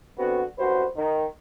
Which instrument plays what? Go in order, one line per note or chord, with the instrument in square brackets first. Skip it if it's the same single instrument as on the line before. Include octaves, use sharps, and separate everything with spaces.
[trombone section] D3 B3 C4 F#4
C2 F#2 F#4 B4 C5
D#3